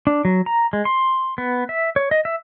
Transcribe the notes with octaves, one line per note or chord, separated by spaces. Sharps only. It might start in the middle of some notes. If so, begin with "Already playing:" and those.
D4
F#3
A#5
G#3
C6
B3
E5
C#5
D#5
E5